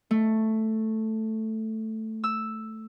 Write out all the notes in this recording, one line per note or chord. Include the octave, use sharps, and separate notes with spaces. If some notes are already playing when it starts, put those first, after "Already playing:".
A3
E6